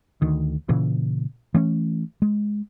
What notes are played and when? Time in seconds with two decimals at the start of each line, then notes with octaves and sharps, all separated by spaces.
0.22 D2 D#3
0.69 A#2 C#3 E3
1.54 E3 A3 C#4
2.22 G#3